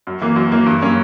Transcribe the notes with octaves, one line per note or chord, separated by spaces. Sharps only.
F#2
E3 A#3
F#2
E3 A#3
G2
F#3 A#3 C#4